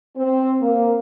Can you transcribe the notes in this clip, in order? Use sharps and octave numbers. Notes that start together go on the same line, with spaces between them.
C4
A#3